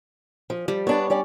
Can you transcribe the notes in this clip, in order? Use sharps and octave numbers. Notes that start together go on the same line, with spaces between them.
F3
F3 G3
B3 D4 C#5 A5
G3 C#4 D5